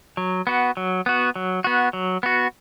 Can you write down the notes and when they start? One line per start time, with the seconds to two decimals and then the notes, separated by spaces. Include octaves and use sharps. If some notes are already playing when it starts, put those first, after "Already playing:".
0.17 F#3
0.47 B3 F#4
0.77 F#3
1.06 B3 F#4
1.36 F#3
1.64 B3 F#4
1.93 F#3
2.23 B3 F#4